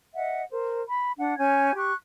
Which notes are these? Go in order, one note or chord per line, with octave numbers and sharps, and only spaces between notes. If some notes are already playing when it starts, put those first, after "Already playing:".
D#5 E5 F#5
A#4 C5
B5
D4 F#5
C#4 G#5 G6 G#6
G4 C#6 F#6